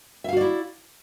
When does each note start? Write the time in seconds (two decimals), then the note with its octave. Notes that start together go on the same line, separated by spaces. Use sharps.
0.24 E5
0.28 F5
0.33 F#4
0.37 D5
0.41 E4